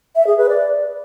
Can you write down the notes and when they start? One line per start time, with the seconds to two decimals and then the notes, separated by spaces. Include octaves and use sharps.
0.16 E5
0.27 G#4
0.38 B4
0.49 D5